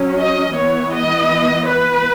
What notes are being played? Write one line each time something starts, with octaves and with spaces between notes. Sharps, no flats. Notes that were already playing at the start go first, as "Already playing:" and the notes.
Already playing: F#3 C#4
D#5
E3 B3 C#5
D#5
B4